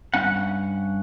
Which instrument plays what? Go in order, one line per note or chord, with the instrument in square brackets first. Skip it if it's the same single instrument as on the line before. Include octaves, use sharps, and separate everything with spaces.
[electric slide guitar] G2 C#4 F#5